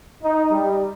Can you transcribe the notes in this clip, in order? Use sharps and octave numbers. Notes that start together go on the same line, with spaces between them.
D#4
G3